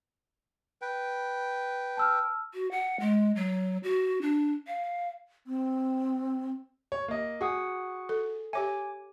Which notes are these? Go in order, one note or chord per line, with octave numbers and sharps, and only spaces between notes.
B4 G5
A5 E6 F6
F#4
F#5
G#3
F#3
F#4
D4
F5
C4
C#5
A#3 D#5
F#4 G#4 F#5 D#6
A4
G4 C#5 E5 G#5 D6